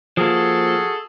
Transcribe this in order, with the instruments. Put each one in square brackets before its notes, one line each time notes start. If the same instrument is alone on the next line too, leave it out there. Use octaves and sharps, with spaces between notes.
[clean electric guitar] F3 A#3 [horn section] F#4 G#4 A4